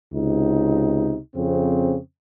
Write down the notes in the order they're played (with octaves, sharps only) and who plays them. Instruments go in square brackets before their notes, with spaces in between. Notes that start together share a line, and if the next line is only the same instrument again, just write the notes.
[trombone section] C#2 C3 D#4
F2 C#3 C4